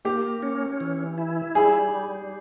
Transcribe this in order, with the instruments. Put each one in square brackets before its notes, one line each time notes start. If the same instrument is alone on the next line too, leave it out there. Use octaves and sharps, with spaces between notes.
[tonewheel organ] A#3 [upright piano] G4
[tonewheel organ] C#4
E3
E4
[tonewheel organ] G3 [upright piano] G#4